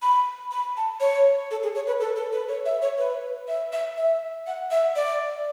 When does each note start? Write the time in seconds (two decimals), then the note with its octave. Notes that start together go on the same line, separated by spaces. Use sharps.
0.02 B5
0.51 B5
0.77 A5
1.00 C#5
1.51 A4
1.63 G#4
1.75 C#5
1.87 B4
2.00 A4
2.16 A4
2.32 B4
2.48 C#5
2.65 E5
2.82 C#5
2.98 B4
3.48 E5
3.72 E5
3.98 E5
4.47 F#5
4.71 E5
4.96 D5